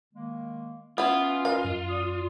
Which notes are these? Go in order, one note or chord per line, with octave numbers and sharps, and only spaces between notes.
D#3 G#3 A#3
B3 C#4 E4 F4
A#4 B4 D#5 F5
F#2
D5 D#6